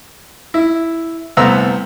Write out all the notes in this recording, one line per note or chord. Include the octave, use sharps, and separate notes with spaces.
E4
C2 A3 B3 C5 A#5 E6